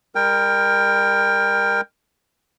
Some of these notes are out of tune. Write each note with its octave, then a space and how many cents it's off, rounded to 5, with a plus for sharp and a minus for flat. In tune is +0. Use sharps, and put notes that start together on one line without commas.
G3 +45 A#4 +0 G5 +20